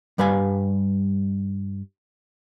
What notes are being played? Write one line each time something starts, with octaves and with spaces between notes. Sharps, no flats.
G2 G3 B4 F5 G#5